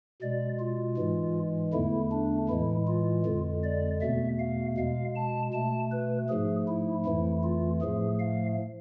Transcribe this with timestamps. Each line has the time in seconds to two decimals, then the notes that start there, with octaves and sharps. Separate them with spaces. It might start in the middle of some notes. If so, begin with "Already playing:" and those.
0.22 B2 G#3 D5
0.60 F4
0.97 G#2 E3 G#3
1.73 E2 D3 A3 E4
2.11 D4
2.49 A2 E3 G#3 E4
2.87 F4
3.26 F2 D3 G#3
3.64 D5
4.02 E2 B2 A3 E5
4.39 F5
4.77 B2 G#3 F5
5.16 A5
5.53 B2 A3 A5
5.92 B4
6.29 G#2 F3 A3 G#4
6.68 E4
7.06 F2 E3 A3 E4
7.44 F4
7.82 A2 F3 A3 G#4
8.19 F5